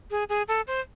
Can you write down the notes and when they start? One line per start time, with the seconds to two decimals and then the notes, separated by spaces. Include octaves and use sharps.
0.11 G#4
0.29 G#4
0.48 A4
0.67 C5